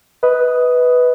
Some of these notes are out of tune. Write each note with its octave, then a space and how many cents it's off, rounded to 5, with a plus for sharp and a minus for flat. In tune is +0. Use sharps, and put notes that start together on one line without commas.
B4 +0 D#5 +35 D#6 +0